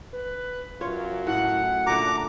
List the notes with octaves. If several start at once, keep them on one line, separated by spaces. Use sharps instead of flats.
B4
F#2 F4 C#5
A2 A3 F#5
A#2 D3 A3 A#5 D6